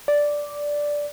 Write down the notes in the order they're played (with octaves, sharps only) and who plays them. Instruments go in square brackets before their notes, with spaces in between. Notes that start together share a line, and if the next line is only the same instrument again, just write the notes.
[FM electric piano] D5